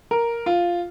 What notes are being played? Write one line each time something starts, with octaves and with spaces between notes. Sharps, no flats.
A#4
F4